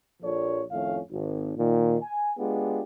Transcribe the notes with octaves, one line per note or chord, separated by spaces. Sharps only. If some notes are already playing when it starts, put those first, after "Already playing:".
A#1 A#2 F3 A4 C#5 D5
F2 A2 D#3 A3 C#4 F5
G#1
A#2 D#3
G#5
G#3 B3 D4 F4 G4 G#4